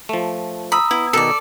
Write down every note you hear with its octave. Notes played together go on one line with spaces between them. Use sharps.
F3 A3
A#5 B5 D#6 E6
B3 E4
B2 D#3 A4 D5